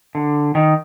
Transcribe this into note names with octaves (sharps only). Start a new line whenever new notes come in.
D3
D#3